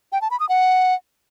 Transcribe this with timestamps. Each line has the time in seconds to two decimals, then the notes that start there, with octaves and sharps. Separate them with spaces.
0.12 G5
0.22 A5
0.31 B5
0.40 D#6
0.49 F#5